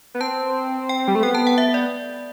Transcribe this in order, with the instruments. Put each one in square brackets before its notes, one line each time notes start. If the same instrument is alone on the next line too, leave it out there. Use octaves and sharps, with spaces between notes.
[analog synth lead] B3
[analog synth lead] C4 [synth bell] A5
[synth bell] G5
[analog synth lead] G3
A3
[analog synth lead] B3 [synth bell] G5
[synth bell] A5
F#5
E5
D5